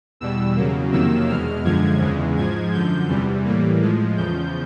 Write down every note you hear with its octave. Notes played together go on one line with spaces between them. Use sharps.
E2 B2 G3 E6
E2 C#3 F#3 A#3
F2 C3 D#3 F#3 A#3 E6
E2 B2 G#3 F6
F#2 D3 F3 G#3 G#6
E2 C#3 E3 G#3
G#2 F3 G#3 G#6
F#2 D3 F3 G6
E2 C3 E3 G3
A2 E3 G3 A#3
A2 F3 G#3
E2 C#3 F3 G6